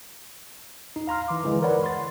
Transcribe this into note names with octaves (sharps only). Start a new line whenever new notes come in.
D#4
F5 A#5 C6 F6
E3 C6 D6
D3 E3 G#3
A#4 B4 C#5 D5 F#5 B5
C6 A6